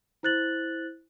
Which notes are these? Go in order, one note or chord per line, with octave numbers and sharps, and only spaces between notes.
E4 C5 F#6 A6 F#7